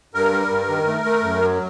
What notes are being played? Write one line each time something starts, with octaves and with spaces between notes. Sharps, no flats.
G2 A#4
G3
G2
D#3
A3
A3
F#2
F#3